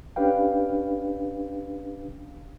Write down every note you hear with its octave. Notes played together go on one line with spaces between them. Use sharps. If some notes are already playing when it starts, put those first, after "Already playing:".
C#4 D4 G4 B4 F5 G5